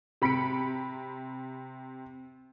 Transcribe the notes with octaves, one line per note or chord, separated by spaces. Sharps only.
C3 B5 B6 C#7 D7